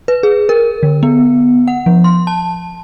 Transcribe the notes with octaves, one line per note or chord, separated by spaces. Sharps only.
B4
G#4
A#4
D3
B3
F#5
F3
C6
A5